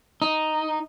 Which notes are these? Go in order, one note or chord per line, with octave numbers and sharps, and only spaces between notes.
D#4